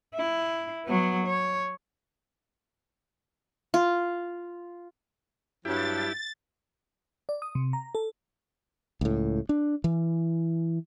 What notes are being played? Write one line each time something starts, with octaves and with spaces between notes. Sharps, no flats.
E4
F#3 B3
C#5
F4
G2 F#3 E4 G4 A6
D5
D#6
C3
A#5
A4
C#2 A2
D4
E3